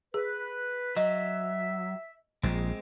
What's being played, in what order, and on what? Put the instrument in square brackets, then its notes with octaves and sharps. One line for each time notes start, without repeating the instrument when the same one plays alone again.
[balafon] G#4 [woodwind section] B4
[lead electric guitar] F#3 [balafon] D#5 [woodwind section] E5
[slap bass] A#1 [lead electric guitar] G#3 C4